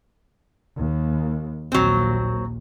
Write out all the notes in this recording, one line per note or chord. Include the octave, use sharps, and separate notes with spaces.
D#2
A#1 D#2 F#3 C4